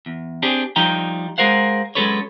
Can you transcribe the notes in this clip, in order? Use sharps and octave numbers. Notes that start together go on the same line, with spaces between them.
E2
C4 D4 G4 G#4
F3 G3 D#4 G5 A#5
G#3 G#4 A#4 C5 F5 F#5
F#3 G#3 C#4 A4 B4 C#5